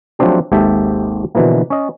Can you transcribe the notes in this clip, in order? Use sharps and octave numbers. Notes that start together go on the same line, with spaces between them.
F3 F#3 A3 C4 D4 G4
G#1 D#2 G#2 G4 A4 E5
B2 D3 E3 F3 A#3
C#4 D#5